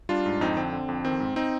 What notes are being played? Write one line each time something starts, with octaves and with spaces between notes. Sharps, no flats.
G3 D4 F4
G#2
F2 C4 D#4
D3 C4
D3
F2
D#3 C4
G#2
C4 D#4